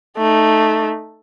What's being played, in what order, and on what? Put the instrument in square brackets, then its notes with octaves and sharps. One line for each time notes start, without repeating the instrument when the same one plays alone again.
[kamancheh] A3 D#4